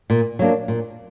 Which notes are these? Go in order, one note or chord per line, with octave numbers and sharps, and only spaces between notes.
A#2
F#3 A#3 D4
A#2